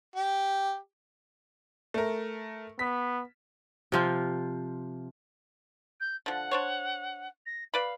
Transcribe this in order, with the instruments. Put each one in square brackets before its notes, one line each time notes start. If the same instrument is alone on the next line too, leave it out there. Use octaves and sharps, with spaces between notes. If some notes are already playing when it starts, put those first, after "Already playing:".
[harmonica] G4
[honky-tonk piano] A3 A#4
[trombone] B3 [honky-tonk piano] B6
[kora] C3 F3 F4
[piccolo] G6
[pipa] D3 F3 [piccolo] F#5
[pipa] D4 C5 C#5
[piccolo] A#6
[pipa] B4 D5 B5 [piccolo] F5